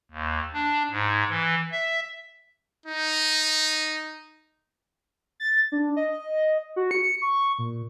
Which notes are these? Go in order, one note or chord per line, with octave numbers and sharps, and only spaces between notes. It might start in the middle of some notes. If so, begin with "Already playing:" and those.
D#2
D4
G#2
E3
E5
D#4
A6
D4
D#5
F#4
C#7
C#6
A#2